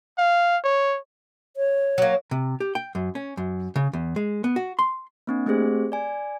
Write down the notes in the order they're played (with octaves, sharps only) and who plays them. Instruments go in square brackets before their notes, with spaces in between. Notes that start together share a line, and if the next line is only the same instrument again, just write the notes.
[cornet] F5
C#5
[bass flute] C#5
[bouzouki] F#3 A#3
[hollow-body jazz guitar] C3
G4
G5
F#2
C#4
F#2
C#3
E2
G#3
B3
F#4
C6
[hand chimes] A#3 C4 D4
A3 C4 G4 G#4 C5
D5 G#5